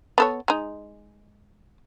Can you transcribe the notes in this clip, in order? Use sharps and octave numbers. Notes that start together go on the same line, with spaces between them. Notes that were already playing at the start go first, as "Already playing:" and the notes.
B3 A4 C#5
G#3 D#4